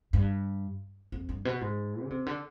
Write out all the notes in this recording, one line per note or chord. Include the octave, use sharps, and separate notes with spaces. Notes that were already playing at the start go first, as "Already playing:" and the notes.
G2
F2
G2
B2
G#2
D3
C3
D3